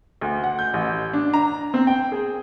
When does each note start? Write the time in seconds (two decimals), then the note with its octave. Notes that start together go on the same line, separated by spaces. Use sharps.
0.21 D2
0.44 F#5
0.59 G6
0.74 A1
1.13 D4
1.34 A#5
1.74 C4
1.87 G5
2.12 G#4